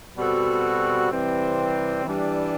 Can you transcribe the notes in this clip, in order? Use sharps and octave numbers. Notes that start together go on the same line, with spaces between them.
B2 G3 C4 F#4 A4
C3 E3 G3 C4
E3 G3 D4